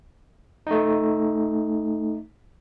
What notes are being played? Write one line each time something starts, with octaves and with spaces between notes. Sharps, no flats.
A3 D#4